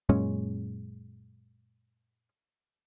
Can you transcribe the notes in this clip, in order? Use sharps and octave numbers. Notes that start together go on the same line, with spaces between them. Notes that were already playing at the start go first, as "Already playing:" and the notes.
F#2 A#2 G#3 C#4